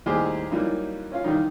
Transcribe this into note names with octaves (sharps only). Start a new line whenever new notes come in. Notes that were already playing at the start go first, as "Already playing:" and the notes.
D#2 A2 G3 G4 G#4 C5
E3 F#3 G3 A#3 D#4 F4
C#4 F4 F5
D#3 E3 G3 D#4